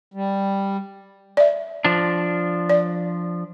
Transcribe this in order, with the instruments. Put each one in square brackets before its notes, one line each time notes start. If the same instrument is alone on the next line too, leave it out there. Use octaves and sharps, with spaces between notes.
[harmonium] G3
[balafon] D5 E5
[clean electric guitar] F3 D4
[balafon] D5